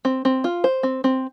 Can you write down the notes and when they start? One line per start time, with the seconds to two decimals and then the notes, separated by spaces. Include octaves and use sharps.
0.05 C4
0.25 C4
0.44 F4
0.64 C5
0.83 C4
1.04 C4